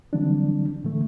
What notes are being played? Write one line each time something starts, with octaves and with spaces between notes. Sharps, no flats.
D3 E3 F#3 G3 C4 D4
A2 D3 E3 A3